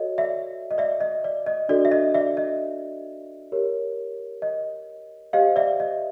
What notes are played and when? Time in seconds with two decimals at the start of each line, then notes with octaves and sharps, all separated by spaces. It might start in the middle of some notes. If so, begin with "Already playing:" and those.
Already playing: F#4 A4 C#5 D#5
0.18 D5 E5
0.71 D#5
0.78 D5 E5
1.00 D#5
1.24 D5
1.46 D#5
1.69 D4 F#4 A4 D5
1.85 E5
1.92 D#5
2.14 D5 E5
2.37 D#5
3.52 G4 A#4 C#5
4.42 D#5
5.33 G4 C5 D#5 F5
5.56 D5 E5
5.80 D#5